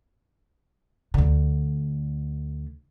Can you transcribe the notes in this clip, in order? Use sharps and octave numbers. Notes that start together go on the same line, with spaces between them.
D2 D3